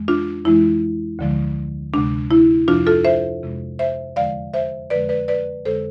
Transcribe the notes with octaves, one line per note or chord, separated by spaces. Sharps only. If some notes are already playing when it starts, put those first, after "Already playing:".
Already playing: F2 E3 G#3
D4 F4
F2 E3 G#3 E4
D2 D3 F3 G#3
D2 C3 G#3 D4
E4
F2 C3 F3 D4 F4
F4 A4
C5 E5
F2 C3 G#3
C5 E5
E2 D3 F3 G#3 D5 F5
C5 E5
F2 D3 F3 G#3 B4 D5
B4 D5
B4 D5
F2 D3 G#3 A4 C5